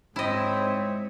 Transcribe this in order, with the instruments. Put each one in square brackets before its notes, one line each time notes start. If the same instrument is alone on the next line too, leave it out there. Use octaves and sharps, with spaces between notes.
[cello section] G#2 C#5 E5 [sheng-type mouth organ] C4 [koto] E4 D#5